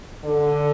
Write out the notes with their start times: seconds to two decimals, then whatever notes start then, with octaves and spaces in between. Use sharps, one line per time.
0.24 D3